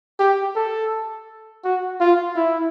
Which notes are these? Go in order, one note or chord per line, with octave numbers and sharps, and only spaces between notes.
G4
A4
F#4
F4
E4